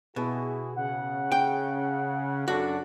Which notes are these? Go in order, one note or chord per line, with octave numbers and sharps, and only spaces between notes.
B2 E4 F#4 G#4
C#3 F#5
G5
F#2 D4 F#4 A4